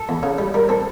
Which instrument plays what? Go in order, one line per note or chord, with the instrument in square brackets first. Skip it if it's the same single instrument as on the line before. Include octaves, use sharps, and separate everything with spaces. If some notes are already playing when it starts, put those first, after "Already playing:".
Already playing: [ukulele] A4
[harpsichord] E2
C#3
G3
[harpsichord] G3 [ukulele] A#4
[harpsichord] C4 [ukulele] A4